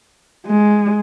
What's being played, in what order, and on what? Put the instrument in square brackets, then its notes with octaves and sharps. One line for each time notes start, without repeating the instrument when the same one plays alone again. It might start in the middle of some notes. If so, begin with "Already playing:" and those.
[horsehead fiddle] G#3